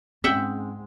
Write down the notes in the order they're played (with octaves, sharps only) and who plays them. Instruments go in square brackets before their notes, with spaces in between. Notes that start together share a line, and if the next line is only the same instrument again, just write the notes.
[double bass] G#2 G#3 [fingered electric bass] C4 C#4 [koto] E5 F#5 G5